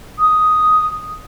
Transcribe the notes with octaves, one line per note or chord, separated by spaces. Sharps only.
D#6